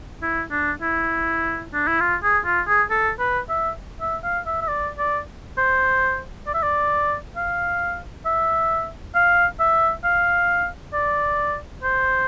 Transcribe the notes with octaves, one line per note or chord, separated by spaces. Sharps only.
E4
D4
E4
D4
E4
F4
G#4
F4
G#4
A4
B4
E5
E5
F5
E5
E5
D5
D5
C5
D5
E5
D5
F5
E5
F5
E5
F5
D5
C5